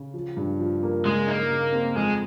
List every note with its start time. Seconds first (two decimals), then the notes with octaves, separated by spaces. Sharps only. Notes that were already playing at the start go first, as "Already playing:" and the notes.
Already playing: C#3
0.14 F3
0.37 G2
0.60 F3
0.83 A#3
1.05 C#3 G#3
1.27 A#3 D#4
1.50 C#3
1.73 C4
1.96 F2 G#3